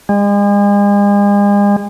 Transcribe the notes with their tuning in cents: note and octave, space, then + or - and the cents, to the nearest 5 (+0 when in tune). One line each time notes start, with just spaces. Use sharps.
G#3 -40